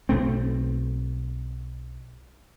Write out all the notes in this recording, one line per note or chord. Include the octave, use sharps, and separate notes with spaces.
B1 A3 C4